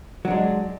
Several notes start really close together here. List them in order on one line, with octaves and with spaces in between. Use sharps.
F#3 D4 G#3